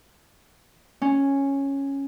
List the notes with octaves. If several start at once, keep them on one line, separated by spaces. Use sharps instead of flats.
C#4